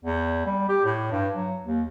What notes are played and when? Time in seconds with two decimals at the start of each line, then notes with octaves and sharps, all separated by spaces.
0.04 E2
0.46 G3
0.69 G4
0.85 A2
1.12 G2
1.35 F#3
1.65 D#2